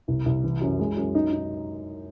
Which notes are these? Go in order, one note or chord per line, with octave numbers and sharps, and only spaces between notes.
C2
C2
E3
F#2
G#3
F#2
D#4
D#4